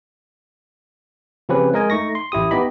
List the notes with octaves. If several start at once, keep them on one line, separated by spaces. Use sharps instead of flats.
C#3 F3 C4 C#4 G4 B4
G#3 A#4 D#5 G#5
A3 D#4 C#6 A#6
C6
A1 E4 G4 D#6
B3 D#4 G4 D#5 B5